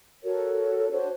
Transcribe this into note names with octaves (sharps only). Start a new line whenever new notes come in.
F#4 A4 A#4 C#5
D4 F#4 C5 C#5